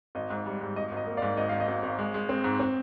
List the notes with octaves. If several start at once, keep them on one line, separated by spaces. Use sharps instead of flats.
G#1 D#5
G#2
G3
G#2
G#1 D#5
G#1
D#5
A#3
D5 F5
G#2
G#1 D#5
G#1 F5
D#5
G#1
G#1
G#3
G#3
C4
G#2
C4